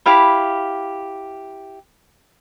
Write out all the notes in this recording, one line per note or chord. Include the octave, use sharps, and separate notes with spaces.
E4 G4 F5 B5